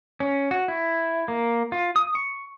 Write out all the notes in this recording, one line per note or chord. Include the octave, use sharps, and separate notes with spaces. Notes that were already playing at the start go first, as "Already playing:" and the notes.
C#4
F#4
E4
A#3
F4
D#6
C#6